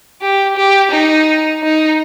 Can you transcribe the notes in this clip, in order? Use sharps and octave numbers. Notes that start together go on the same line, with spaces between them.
G4
G4
D#4
D#4